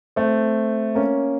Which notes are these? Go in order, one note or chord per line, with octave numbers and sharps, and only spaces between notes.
A3 C4
A#3 C#4